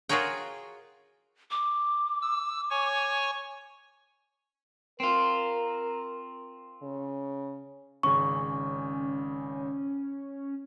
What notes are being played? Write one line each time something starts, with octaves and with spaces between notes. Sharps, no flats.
F4 F#4 G#4 A#4 C#5 G5
D6
E6
C#5 G#5 C#6
C4 F4 A#4
C#3
G#1 C#3 C#4 C#6